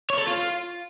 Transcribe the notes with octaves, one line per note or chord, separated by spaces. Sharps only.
C#5
A4
F4